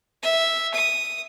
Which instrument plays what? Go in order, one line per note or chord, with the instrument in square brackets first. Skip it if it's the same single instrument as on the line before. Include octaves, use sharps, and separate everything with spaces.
[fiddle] E5
D#6